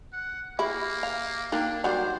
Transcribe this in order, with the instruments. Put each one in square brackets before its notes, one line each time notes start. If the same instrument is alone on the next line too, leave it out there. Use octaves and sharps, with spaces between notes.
[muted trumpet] F#5
[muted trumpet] A#3 [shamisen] E4 [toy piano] G4 G#4 E5
[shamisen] F5
[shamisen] A#3 [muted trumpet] D4 [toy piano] D#4 G5 A5
[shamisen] F#3 G3 [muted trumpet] C5 [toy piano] D5 F#5 D6